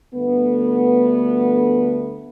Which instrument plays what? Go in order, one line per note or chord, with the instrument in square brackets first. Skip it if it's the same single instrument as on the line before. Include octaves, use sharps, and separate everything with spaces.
[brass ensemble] D2 G2 D3 A3 B3